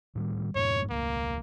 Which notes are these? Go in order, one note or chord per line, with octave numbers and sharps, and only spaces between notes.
A2 D#3 G3
F2 G#2 B2 C#5
E1 C#2 A#3